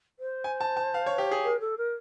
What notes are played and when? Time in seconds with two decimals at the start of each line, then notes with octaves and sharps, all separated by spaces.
0.19 C5
0.44 G#5
0.61 A5
0.77 A5
0.94 F5
1.06 C#5
1.18 G4
1.31 G#4
1.44 A#4
1.60 A4
1.77 A#4